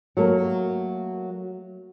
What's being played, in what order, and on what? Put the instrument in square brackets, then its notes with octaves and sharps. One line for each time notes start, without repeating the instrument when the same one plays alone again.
[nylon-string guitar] F#3 A3 A#3